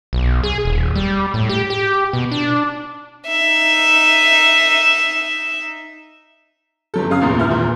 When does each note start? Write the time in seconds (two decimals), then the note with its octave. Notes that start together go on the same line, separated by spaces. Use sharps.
0.13 B1
0.43 G#4
0.65 D#1
0.95 G3
1.34 A2
1.49 G4
1.70 G4
2.13 B2
2.31 D4
3.27 D#4 E5
6.94 G1 F#3 A4
7.09 F#2 C#3 F5 D#6
7.21 A#1 E2 A#2
7.38 G#1 E4 F6
7.50 E2 A#2